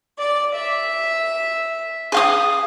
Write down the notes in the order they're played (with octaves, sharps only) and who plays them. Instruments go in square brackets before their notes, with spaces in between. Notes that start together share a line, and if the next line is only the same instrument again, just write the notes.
[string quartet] D5
E5
[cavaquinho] G#4 F5 D#6